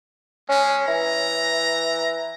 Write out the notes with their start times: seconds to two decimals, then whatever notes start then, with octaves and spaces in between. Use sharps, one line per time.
0.49 G#3 C#4
0.88 E3 A#5